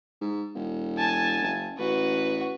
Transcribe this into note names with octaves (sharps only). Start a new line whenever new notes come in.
G#2
E1
G#5 A5
F#1
A1 F#4 B4